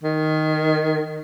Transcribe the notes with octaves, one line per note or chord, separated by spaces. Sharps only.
D#3